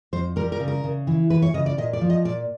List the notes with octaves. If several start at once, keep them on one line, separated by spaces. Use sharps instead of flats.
F2 C5
G3 A#4
A#4
C#3
A#4
C#3
E3
E3 B4
C#5
C#3 D#5
D5
A#2 D#5
D5
F3
D#5
A#2 D5